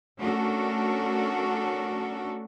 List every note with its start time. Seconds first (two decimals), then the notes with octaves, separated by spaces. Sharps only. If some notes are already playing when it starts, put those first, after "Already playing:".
0.18 A3 C#4 D4 F#4 A4 A#4